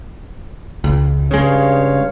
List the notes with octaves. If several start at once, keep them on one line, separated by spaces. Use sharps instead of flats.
C#2
G2 C#3 G#3 C#5 F5